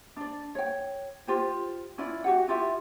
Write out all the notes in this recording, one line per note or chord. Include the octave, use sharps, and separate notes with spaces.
D4 D5
C#5 G5
F4 G4 C5
C#4 E4 F4 D5
F#4 G4 F#5
E4 F4 G4 E5